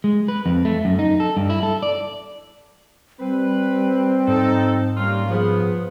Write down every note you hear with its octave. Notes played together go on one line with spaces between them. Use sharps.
G#3
B4
F2
A3
F#2
D#4
A4
G2
E4
A4
D5
G3 C4 B4
G#2 D#4 A4
G3 A#3 C#4 F4
F3 B3 G#4